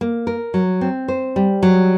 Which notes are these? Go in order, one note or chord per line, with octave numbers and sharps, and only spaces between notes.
A#3
A#4
F#3
C4
C5
G3
F#3